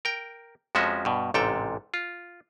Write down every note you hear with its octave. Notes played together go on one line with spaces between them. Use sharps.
A#4 G5
F2 F3 G#3 C#4 F#4 E5
G2 B2
A1 G#2 C3 A4 G5
F4